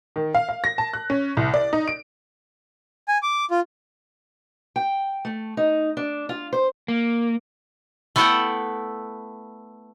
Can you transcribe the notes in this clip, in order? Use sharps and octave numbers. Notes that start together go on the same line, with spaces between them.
D#3
F5
F5
A#6
A5
F#6
C#4
C2
D5
D#4
D7
G#5
D6
F4
G5
A3
D#4
D4
F4
C5
A#3
A3 B3 E4 A4 F#5 G5